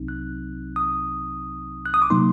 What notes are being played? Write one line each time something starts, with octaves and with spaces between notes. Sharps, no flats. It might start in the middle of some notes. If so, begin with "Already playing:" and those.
Already playing: C2 C3 F#3 C4 D#4
F#6
D#6
F#6
D#6
D6
C3 F#3 A#3 D#4 C6